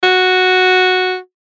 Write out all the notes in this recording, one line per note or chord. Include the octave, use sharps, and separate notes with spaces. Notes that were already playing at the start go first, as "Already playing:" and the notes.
F#4